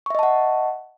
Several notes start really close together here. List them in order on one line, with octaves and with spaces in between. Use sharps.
C#6 E5 D#5 A5 F#5